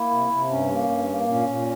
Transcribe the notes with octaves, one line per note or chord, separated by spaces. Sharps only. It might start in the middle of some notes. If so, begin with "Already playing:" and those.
Already playing: A#3 E4
C3
C3
G2 C#4
A#3
G2
A#3
A#2 C#4
A#2